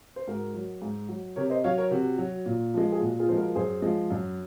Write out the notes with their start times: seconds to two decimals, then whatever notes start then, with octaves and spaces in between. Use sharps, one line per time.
0.16 C5
0.28 G#2 F#4 A#4
0.54 F#3
0.82 G#2
1.09 F#3
1.36 C3 A#4 C#5
1.50 C5 D#5
1.64 F#3 C#5 F5
1.78 A#4 C#5
1.91 C3 F#4
2.18 F#3
2.46 A#2
2.74 F3 G#3
2.92 G#4
3.01 A#2 F#4
3.19 F4 G#4
3.29 F3 G#3 C5
3.37 F#4 A#4
3.55 F#2 G#4 C5
3.82 F3 G#3
4.10 F#2